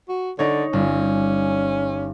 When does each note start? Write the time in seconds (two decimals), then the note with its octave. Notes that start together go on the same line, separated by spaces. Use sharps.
0.09 F#4
0.39 D3 D#4 C#5
0.73 G1 C#4